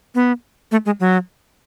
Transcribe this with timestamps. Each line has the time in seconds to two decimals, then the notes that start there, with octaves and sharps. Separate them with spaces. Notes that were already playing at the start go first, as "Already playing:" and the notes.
0.15 B3
0.72 A3
0.86 G#3
1.00 F#3